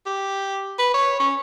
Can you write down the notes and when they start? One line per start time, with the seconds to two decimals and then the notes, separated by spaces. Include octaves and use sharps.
0.06 G4
0.79 B4
0.94 C#5
1.20 C#4